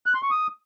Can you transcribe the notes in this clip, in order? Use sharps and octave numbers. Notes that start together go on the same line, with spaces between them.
F#6
C6
C#6
D#6